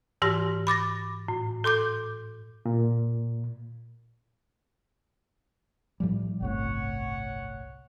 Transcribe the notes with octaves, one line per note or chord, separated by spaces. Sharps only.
G#2 E3 G4 C6 A#6
B5 D6 A6 A#6
A2
A4 C6 D6 G6
A#2
A2 F3 G3
G1 C2 A2 C#5 F#5